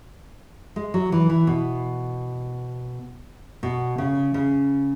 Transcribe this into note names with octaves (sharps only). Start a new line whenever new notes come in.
G#3
F#3
E3
E3
B2
B2
C#3
C#3